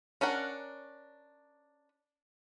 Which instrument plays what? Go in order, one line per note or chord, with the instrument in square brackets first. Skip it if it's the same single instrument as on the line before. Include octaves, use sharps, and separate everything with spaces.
[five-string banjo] C#4 D4 A#4 F#5